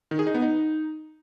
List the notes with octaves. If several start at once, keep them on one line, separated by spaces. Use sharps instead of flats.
D#3
G#4
D#4
B3
D#4